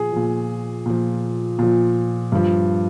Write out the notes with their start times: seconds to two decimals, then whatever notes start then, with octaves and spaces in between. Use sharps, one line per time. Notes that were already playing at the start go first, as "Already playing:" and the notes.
Already playing: A#2 F3 G#4
0.13 A#2 F3
0.86 A#2 F3
1.59 A#2 F3
2.32 G2 F3